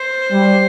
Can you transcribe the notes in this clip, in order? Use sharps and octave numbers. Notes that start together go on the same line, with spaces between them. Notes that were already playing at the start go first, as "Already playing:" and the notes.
Already playing: C5
G3